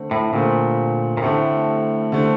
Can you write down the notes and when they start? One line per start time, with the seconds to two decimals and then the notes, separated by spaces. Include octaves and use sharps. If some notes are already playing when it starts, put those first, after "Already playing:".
Already playing: D3 A3 C4
0.11 A2
0.33 A#2 D3 A3 C4
1.17 A#2
1.22 A2 D3 A3 C4
2.12 D3 A3 C4